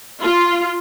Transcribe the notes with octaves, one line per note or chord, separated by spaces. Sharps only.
F4